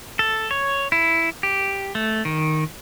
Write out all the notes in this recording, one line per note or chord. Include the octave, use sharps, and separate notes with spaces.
A4
C#5
E4
G4
A3
D#3